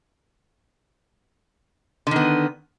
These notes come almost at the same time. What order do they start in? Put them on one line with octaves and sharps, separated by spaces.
D3 D#3 B3